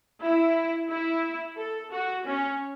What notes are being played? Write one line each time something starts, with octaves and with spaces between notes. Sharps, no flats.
E4
E4
A4
F#4
C#4